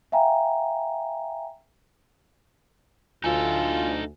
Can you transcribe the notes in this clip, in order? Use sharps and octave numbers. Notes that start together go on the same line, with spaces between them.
E5 F5 G5 G#5 A#5
D2 D#4 F4 A4 G#5